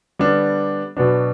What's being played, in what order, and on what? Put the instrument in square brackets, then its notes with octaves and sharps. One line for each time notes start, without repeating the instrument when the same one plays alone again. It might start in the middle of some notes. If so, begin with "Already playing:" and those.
[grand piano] D3 G3 B3 D4
B2 F#3 B3 D4